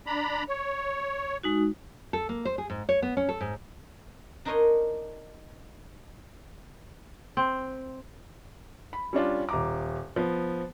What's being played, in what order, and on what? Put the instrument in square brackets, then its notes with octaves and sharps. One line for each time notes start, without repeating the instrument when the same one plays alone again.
[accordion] D4 A#5 B5
C#5
[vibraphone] G#3 D#4 F#4
[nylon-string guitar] A4
A#3
C5
G#4
G#2
C#5
B3
C#4
A4
G#2
[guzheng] D4 D#4 A#4 C5 C#5 D#5
[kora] C4
[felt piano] B5
G3 C#4 D4 F4
D#1 A#5 D6
F3 B3